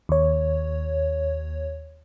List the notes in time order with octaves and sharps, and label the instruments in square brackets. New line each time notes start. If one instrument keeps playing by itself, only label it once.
[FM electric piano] D#2 C#5